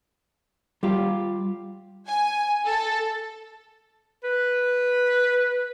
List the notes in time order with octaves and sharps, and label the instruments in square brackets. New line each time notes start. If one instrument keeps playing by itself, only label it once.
[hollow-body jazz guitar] G3 F4 G4 F5
[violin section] G#5
A4
[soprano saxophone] B4